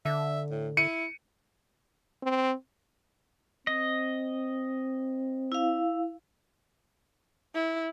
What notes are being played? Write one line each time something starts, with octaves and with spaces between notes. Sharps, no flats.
D3 E5
A2
E4 C#7 D#7
C4
C4 D#5
E4 F5
E4